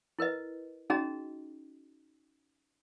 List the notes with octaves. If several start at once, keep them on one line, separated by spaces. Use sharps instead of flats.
E4 A#4 B4 D#5
C#4 D#4 F#4 G#4 D#5 A#5